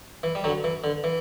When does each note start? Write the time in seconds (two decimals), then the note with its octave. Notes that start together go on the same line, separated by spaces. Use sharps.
0.23 E3
0.35 G3
0.44 D3 F#3
0.64 E3
0.84 D3
1.04 E3